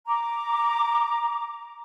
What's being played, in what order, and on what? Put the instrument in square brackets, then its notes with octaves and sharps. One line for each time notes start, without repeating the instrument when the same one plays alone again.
[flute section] A#5 D6